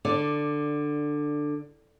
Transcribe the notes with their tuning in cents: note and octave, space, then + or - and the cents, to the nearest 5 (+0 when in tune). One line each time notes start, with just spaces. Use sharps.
D3 +10 D5 +0